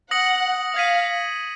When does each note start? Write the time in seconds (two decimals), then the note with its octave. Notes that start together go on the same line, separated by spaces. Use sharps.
0.11 F#5 D#6 A#6 C#7 F#7
0.75 F5 G#6 B6 D#7